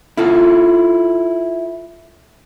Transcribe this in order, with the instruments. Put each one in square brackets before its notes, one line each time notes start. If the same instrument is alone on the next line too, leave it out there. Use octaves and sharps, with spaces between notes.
[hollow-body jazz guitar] E4 F4 A4